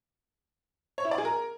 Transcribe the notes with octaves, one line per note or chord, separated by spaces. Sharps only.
C#5
E4
D5
G#4
A#4